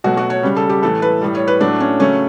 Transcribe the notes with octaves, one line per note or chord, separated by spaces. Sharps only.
B2 F#3 A3 F#4
F#4
C#5
C#3 G3
A4
G4
A2 E3 A3 A4
B4
A2 G3
C#5
B4
A2 F#3 A3 D4
C#4
C#3 F#3 A3 C#4